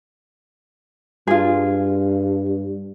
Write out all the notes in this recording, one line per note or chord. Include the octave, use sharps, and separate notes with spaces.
G2 F4 G#4